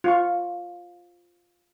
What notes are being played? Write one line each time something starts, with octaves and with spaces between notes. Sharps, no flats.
F4 C#6